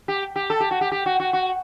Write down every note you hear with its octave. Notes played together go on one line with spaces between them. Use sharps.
G4
G4
A4
G4
F#4
G4
G4
F#4
F#4
F#4